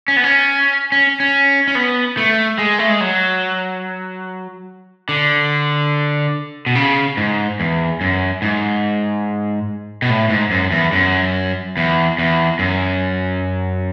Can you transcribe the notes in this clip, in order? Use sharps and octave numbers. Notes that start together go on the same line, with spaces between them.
C#4
B3
C#4
C#4
C#4
C#4
B3
A3
G#3
A3
G#3
F#3
D3
B2
C#3
G#2
E2
F#2
G#2
B2
A2
G#2
F#2
E2
F#2
E2
E2
F#2